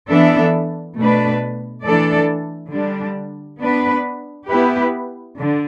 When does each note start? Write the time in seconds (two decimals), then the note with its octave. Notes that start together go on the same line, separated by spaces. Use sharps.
0.10 E3 B3 D4 A4 E5
0.98 B2 A3 D4 B4
1.85 E3 A3 D4 A4 D5
2.74 D3 G3 D4
3.61 B3 D4 B4
4.50 B3 E4 G4 B4
5.38 D3